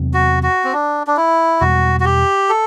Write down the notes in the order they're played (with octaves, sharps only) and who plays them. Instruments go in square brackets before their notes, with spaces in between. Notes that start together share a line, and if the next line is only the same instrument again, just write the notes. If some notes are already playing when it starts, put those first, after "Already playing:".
Already playing: [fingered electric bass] E2 C3 F#3 C4
[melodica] F#4
F#4
C4
D4
D4
E4
[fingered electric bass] E2 B2 G3 [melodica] F#4
[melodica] F#4
G4
A4